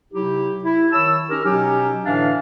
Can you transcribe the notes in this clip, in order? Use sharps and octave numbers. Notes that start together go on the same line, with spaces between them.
C3 F#3 D#4 E4 G4
E4
D#3 C#5 A5 E6
C#4 D#4 G4 A#4
B2 F#3 C#4 D#4 G4
A2 D3 E3 D4 E5 F5